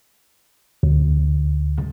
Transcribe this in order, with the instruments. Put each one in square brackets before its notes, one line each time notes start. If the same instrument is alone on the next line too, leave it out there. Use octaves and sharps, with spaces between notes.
[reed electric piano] D2